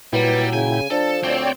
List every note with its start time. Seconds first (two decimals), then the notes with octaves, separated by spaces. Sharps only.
0.13 A#2 F#3 G3 E4 B4 G5
0.53 C#3 G#5
0.91 F3 D4 A4
1.24 D2 C4 C#5 D5 G5